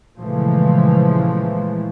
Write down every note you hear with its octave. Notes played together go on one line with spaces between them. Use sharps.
A#2 C#3 E3 F3 G#3 A3